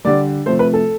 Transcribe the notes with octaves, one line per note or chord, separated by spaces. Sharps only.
D3 G3 D5
C3 F3 A3 C5
B4
A4